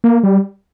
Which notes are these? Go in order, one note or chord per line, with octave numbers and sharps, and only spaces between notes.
A#3
G3